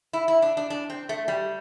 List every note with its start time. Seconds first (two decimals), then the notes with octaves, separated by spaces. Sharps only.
0.13 E4
0.28 E4
0.42 D4
0.57 D4
0.70 D4
0.90 C4
1.09 A3
1.28 G3